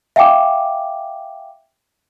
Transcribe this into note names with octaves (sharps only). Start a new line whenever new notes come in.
E5 F5 G5 G#5 D6